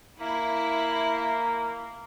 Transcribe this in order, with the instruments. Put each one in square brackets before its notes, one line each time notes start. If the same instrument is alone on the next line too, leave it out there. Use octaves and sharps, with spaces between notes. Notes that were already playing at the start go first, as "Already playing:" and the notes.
[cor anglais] A#3 [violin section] E4